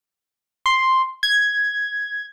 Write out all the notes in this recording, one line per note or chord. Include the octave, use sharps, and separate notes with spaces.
C6
G#6